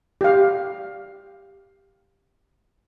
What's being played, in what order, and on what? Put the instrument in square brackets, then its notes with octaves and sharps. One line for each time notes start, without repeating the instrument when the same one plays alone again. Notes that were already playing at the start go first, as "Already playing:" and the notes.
[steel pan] G4 F5